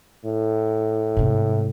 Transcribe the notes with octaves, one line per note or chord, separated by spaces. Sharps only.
A2
G#2 C3